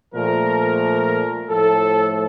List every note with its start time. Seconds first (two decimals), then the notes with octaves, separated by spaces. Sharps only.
0.15 A#2 F3 A3 A#4
1.48 A2 F3 A3 A4